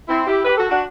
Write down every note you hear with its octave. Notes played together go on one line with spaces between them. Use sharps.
C4 E4
E4 G4
G4 B4
F#4 A4
D4 F#4